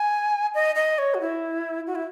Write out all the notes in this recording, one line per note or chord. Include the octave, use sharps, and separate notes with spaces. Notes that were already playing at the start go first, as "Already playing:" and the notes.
Already playing: G#5
D#5
D#5
C#5
F#4
E4
F#4
E4